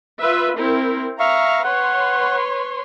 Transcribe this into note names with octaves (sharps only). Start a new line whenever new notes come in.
F4 B4 E5
C4 E4 A#4
E5 F5 A#5 C#6
B4 C#5 F#5 C6